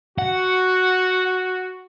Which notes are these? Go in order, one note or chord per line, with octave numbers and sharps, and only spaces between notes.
F#4 F#5